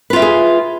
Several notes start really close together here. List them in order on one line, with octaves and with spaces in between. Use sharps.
B4 F4 E5 G4 G#4